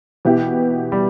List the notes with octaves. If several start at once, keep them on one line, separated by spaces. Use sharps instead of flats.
B2 E3 B3 E4 G4
G3